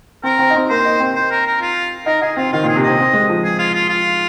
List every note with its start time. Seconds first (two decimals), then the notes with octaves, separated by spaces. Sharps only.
0.23 C4 A#4
0.39 C4
0.50 D#4
0.55 C4
0.70 A#3 C5
0.85 D#4
1.00 C4
1.15 C5
1.31 A#4
1.46 A#4
1.61 F4
2.06 D#4 A#4
2.21 D#4 G#4
2.37 C4 F4
2.52 D#3 F4
2.63 A#2
2.67 G#4
2.76 C3
2.83 C4 D#5
2.98 C4
3.13 G#3
3.29 F3
3.44 G#4
3.59 F4
3.74 F4
3.89 F4